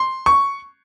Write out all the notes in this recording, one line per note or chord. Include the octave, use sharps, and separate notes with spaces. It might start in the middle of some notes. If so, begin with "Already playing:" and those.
Already playing: C6
C#6